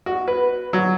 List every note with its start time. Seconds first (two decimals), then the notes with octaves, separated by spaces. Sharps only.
0.06 F#4
0.28 B4
0.73 F#3